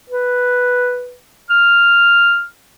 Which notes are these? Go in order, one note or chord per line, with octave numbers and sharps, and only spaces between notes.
B4
F6